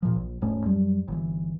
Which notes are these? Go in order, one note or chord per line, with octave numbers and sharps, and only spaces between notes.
A#2 F3
A#1
D#1 G#2 A3 C#4
F#2 G3
G1 E3